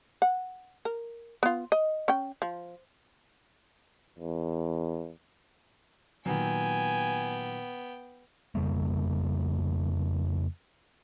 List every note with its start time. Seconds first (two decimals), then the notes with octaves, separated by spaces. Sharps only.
0.22 F#5
0.85 A#4
1.43 B3 F4
1.72 D#5
2.08 C#4 G5
2.42 F3
4.19 E2
6.26 A#2 D#3 F#3 B3 G5 G#5
8.55 F2 C#3 G3 A#3